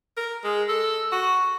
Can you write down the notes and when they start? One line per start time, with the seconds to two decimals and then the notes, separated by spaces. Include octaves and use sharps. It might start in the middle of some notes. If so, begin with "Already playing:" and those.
0.17 A#4
0.44 G#3
0.69 A4
1.12 F#4